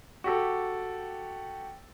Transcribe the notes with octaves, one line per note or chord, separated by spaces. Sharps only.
F#4 G4 A4